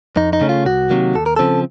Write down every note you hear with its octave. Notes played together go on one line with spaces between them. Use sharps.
F2 D#4
D#4
C#3 A3 C#4
F4
C2 F#4
C3 D#3 F#3 A#3
D#2 A4
A#4
C#3 F3 C4 A4